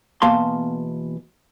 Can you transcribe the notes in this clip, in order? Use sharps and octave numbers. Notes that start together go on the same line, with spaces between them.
E2 B2 A#3 F5 A5 C6